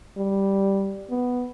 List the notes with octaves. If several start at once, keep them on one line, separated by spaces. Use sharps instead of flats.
G3
B3